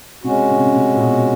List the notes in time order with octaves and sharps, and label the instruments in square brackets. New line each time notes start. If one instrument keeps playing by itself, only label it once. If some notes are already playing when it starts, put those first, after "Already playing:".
[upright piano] C3 [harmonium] G#3 C#4 F#4
[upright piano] C#3
C3
C#3
C3
A#2
B2